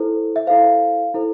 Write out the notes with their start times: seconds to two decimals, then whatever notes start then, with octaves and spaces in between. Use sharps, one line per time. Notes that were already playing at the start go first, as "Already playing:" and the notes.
Already playing: E4 A4 C5
0.36 E5
0.47 E4 A4 C5 F5
1.14 E4 A4 C5